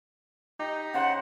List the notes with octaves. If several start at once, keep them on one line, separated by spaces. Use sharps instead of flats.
D#4 G4
C#3 C5 F#5